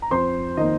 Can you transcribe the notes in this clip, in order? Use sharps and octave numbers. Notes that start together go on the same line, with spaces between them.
A#5
F2 C5 C6
D#3 A#3 D#4 D#5